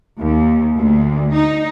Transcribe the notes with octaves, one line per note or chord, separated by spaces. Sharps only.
D#2
D2
D#4